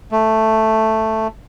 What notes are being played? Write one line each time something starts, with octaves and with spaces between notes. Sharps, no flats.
A3